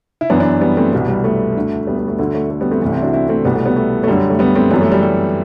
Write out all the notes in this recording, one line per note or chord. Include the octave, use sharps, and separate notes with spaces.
E4
F#2 E3 B3 D4
B3 D4
G3 B3
A3 C4
C2 B2 G3 B3
G3
A3
D2 D3
G3 B3
A3
A3
D2 D3 A3
A3
A3
G3 B3
A3 C4
C2 C3 E3 A3 C4
C4 E4
D4 F#4
C4 E4
A3 C4
C2 B2 G3 B3
A3
G3 B3
A3
A3
F#2 D3 G3
A3
G3 B3
A3 C4
F#2 E3 G3 B3
A3
G3
G3